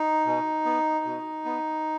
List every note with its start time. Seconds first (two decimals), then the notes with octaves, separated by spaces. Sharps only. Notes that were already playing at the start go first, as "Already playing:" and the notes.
Already playing: D#4
0.26 B2
0.65 B3
1.05 B2
1.45 B3